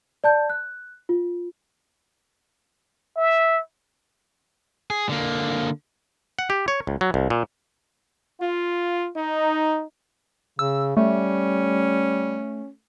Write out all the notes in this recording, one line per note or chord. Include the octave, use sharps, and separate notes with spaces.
D5 A5 G6
F#6
F4
E5
G#4
D3 A#3
F#5
G4
C#5
C#2
F#3
C2
A#2
F4
D#4
C#3 E6
G3 A3 C#4